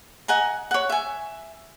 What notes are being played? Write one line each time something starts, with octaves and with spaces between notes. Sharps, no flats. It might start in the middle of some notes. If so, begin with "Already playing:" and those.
D#5 F#5 G#5 A#5
C#5 F#5
E5 G#5